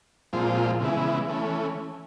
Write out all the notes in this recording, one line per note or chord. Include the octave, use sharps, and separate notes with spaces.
A#2 F3 G#3 C4 F4
C#3 E3 G#3 B3 E4
E3 A3 C#4